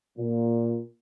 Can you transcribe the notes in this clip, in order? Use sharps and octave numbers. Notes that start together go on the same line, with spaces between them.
A#2